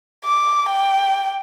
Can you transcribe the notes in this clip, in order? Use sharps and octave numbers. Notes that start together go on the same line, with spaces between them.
D6
G5